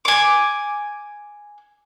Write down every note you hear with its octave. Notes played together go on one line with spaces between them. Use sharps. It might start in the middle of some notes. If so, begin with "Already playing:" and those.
G#5 D6